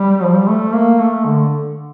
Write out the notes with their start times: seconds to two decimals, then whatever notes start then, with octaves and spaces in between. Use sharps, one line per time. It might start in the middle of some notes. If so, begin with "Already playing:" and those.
Already playing: G3
0.22 F3
0.34 G3
0.47 A3
0.73 A#3
0.99 A3
1.25 D3